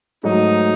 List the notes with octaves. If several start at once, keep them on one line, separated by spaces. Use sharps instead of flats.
G#2 F#3 A3 D#4